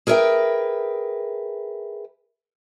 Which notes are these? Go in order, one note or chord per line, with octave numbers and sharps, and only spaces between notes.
G#4 A#4 B4 C#5 E5 G5